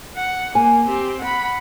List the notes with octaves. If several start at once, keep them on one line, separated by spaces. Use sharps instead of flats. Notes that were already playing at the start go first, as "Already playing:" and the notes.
F#5
A#3 G#5
C4 G4
F#5 B5